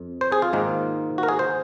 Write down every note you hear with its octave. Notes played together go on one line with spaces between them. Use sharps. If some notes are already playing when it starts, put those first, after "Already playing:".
Already playing: F2
C5
G#4
F4
G#2 D#3 A#3
F#4
A#4
G#4
C5